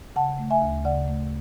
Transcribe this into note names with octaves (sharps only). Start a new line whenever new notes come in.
C#3 F#5 A5
A3
E5 G#5
D2
C#3 D5 F#5
A3